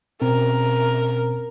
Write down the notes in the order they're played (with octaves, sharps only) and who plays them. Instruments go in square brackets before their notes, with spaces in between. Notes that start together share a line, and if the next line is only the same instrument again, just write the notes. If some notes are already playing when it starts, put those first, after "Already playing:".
[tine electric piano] B2 C4 C#4 [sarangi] A#4